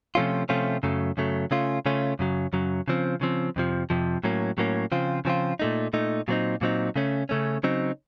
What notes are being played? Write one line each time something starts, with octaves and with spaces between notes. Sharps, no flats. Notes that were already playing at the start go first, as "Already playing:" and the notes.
C3 F3 A3 C#4 F4
C3 F3 A3 C#4 F4
F#2 C#3 F#3 A3
F#2 C#3 F#3 A3
C#3 A3 C#4 F4
C#3 A3 C#4 F4
F#2 C#3 F#3
F#2 C#3 F#3
C#3 F3 C4
C#3 F3 C4
F2 C3 F3
F2 C3 F3
A2 F#3 A#3 C#4
A2 F#3 A#3 C#4
C#3 F3 C4 F4
C#3 F3 C4 F4
A#2 A3 D#4
A#2 A3 D#4
A#2 F#3 C4 D#4
A#2 F#3 C4 D#4
C#3 A3 C#4
C#3 A3 C#4
C#3 F#3 C4 D#4